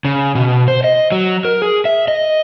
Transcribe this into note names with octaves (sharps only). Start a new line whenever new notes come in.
C#3
B2
C5
D#5
F#3
A#4
G#4
E5
D#5